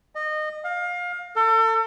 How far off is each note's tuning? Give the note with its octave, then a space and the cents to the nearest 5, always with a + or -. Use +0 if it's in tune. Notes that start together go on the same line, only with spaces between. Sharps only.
D#5 -25
F5 +25
A4 +35